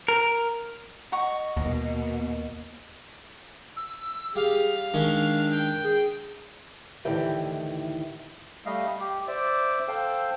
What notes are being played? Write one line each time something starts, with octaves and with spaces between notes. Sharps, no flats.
A#4
D#5 F#5 A#5 C#6
D#2 B2 A#3 A#4
E6
G3 G#4 F5
D#3 G#3 C#4 D4
G5
G#4
D2 A2 D#3 E3 G4 E5
G3 A3 D#5 F5
G4
C5 D5 E5 D6
A4 C5 F5 G5